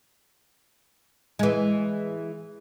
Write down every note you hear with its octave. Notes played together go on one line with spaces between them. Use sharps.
E3 G#3